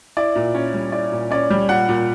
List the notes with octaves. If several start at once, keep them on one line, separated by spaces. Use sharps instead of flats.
E4 D5
A#2
C#4
G3
E4 D5
A#2
C#4 D5
G3
A#2 F#5
A#2